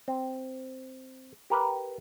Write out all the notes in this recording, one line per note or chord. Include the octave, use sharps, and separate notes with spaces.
C4
G4 A#4 B4